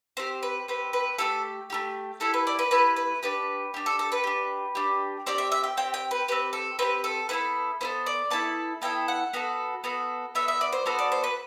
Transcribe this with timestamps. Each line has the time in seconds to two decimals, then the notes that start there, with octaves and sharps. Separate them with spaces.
0.17 C4 G4 C5
0.43 B4
0.68 C4 G4 B4
0.93 B4
1.18 A3 E4 G4 A4
1.70 A3 E4 G4
2.20 A3 E4 G4 A4
2.34 B4
2.47 D5
2.59 B4
2.71 A3 E4 G4 B4
2.96 B4
3.23 D4 G4 B4
3.74 D4 G4
3.86 A4
3.99 A4
4.12 B4
4.24 D4 G4
4.75 D4 G4
5.26 C4 G4 D5
5.38 E5
5.52 E5
5.64 G5
5.77 C4 G4 G5
5.94 G5
6.11 B4
6.28 C4 G4 B4
6.53 A4
6.79 C4 G4 B4
7.04 A4
7.29 B3 E4 A4 B4
7.81 B3 E4 A4 C5
8.06 D5
8.30 B3 E4 A4 A5
8.82 B3 E4 A4 G5
9.08 F#5
9.33 B3 F#4 A4
9.84 B3 F#4 A4
10.35 B3 F#4 A4 E5
10.48 E5
10.61 D5
10.73 C5
10.86 B3 F#4 A4 C5
10.99 D5
11.12 C5
11.24 B4